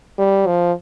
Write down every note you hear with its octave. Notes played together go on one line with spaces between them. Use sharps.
G3
F3